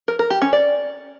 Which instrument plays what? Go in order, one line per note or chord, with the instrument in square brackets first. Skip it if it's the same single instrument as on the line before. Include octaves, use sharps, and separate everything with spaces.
[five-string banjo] A#4
A#4
G4
C#4
D5